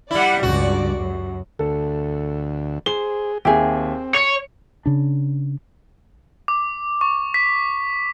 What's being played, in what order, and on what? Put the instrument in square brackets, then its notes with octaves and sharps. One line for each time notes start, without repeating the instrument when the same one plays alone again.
[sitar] G3 E4 [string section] D5 F#5
[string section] C#2 G2 D5 [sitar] F#4
[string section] F#2
[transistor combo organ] D2 [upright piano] A4
[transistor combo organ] G#4 [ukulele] C5 [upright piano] G7
[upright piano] D#2 E5 [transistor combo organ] C4 [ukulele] G4 G#4
[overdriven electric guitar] C#5 [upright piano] C#7
[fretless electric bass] C#3 D4
[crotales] D6
C#6
B6